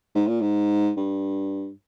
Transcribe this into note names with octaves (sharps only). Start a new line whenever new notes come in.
G#2
A#2
G#2
G2